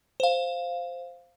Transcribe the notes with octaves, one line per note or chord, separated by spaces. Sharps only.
C5 F5